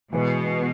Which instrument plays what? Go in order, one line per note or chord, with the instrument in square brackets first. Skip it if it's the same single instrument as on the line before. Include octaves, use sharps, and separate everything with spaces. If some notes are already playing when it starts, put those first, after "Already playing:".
[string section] B2 [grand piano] E3 G#3 B3